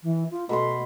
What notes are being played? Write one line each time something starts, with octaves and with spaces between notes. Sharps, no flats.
E3
F4
B2 A3 B4 C6